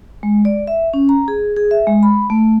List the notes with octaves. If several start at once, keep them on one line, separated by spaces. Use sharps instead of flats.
G#3
D5
E5
C#4
A#5
G#4
G#4
E5
G#3
B5
A3